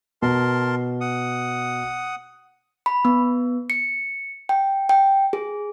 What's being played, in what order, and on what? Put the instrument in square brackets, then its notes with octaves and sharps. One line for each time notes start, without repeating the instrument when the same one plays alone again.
[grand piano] B2 [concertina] A#4 A5 C6
[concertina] F#5 D#6
[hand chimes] B5
B3
C#7
G5
G5
G#4